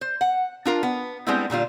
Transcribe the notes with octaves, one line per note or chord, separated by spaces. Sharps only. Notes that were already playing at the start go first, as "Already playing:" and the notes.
C5
F#5
D4 F4 A#4
B3
G3 G#3 B3 C4 D4 E4
A#2 D3 G3 F4